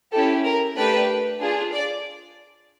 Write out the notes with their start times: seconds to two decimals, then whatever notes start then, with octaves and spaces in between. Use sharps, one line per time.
0.12 C#4 E4 G4 A4
0.44 A#4
0.75 A3 D4 G4 B4
1.40 D4 F4 G#4
1.72 D5